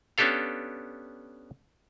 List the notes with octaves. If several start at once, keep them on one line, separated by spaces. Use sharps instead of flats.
B3 C#4 D4 G4 A4 F5